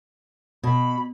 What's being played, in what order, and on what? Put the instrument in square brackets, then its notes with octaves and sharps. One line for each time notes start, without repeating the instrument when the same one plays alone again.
[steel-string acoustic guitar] B2 [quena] B5